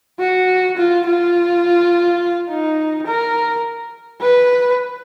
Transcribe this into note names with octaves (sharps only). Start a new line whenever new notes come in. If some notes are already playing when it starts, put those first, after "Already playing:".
F#4
F4
F4
D#4
A#4
B4